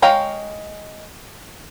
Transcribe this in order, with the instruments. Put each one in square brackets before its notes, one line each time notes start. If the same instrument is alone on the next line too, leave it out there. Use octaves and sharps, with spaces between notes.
[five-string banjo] G#3 C#5 F5 G5 A#5